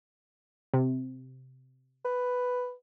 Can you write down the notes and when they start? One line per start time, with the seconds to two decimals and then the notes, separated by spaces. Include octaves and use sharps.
0.74 C3
2.05 B4